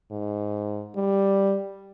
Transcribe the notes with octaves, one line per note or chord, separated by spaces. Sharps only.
G#2
G3